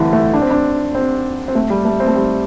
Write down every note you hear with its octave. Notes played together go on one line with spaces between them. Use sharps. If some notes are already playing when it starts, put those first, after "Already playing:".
Already playing: D3 E3 G3 A3 C4
A3
D4
C4
D4
C4
C4
A3
G3
A3
C4
A3
G3